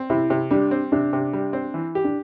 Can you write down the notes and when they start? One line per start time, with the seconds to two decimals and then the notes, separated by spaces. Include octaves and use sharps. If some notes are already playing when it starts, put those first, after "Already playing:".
Already playing: C4
0.10 C3 E4
0.30 C3
0.51 G3 D4
0.71 C4
0.92 C3 D4
1.13 C3
1.33 G3
1.53 C4
1.74 E3
1.95 G4
2.04 D4